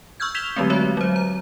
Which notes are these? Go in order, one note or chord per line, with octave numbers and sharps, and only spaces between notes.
C#6 E6 F6 G6 G#6
G6 G#6 B6 E7 F7 G7
D3 F#3 G#3 A3 C4
F#4 C#5 E5
F#3 C5
A#5